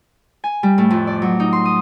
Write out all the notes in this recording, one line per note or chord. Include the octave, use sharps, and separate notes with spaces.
G#5
G3
A2
F2
D5
F#3
D#4
C6
D#6